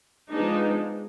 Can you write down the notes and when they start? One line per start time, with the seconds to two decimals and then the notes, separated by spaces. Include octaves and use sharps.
0.30 F3 G#3 B3 D4 D#4